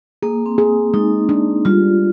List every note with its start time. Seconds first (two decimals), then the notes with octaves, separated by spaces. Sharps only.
0.23 A#3 G#4
0.46 C4
0.58 G#4
0.94 G#3 D#4
1.29 D4
1.65 G3 F4